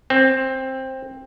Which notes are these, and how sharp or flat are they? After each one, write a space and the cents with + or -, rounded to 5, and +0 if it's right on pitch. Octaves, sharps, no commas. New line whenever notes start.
C4 +10